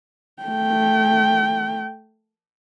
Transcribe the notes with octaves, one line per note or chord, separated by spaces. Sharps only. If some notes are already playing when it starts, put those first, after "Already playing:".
A3 G5